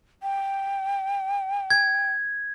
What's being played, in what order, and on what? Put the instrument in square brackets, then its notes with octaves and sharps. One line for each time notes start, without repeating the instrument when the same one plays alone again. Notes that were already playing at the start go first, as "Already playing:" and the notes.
[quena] G5
[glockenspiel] G#6